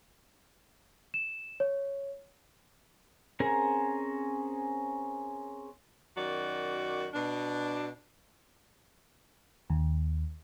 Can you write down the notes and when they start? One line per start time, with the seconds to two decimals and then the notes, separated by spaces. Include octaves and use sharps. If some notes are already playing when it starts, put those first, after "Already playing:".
1.14 E7
1.60 C#5
3.40 C4 C#4 G#4 A#4 A#5
6.16 F#2 D#3 F#4 D5
7.14 B2 D4
9.70 D#2